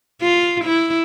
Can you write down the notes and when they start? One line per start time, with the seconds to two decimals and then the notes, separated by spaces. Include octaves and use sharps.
0.22 F4
0.65 E4